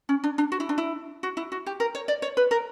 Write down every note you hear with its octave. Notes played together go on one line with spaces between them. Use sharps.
C#4
D4
D4
F#4
E4
D4
E4
F#4
E4
F#4
G4
A#4
C#5
D5
C#5
B4
A#4